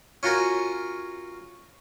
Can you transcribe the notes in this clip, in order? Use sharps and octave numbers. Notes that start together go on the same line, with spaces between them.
C#4 F4 F#4 A#4 G#5